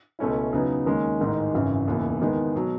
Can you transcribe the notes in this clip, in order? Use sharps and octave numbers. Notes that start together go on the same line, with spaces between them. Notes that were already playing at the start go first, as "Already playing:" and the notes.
C#2 B2 A3 C#4 E4
E2 C#3 F#3 B3 D#4
D#2 D#3 G#3 C#4
A1 G#2 D#3 G#3
G#1 F#2 C#3 E3
E1 D#2 C#3 E3 B3
E2 D#3 G#3 B3
B2 F#3